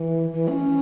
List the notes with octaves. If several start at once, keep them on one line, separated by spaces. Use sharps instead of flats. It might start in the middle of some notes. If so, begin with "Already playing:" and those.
Already playing: E3
E3
C#4